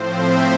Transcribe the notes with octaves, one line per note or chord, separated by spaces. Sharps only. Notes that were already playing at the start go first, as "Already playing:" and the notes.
Already playing: A2 F3 C4 C5
E5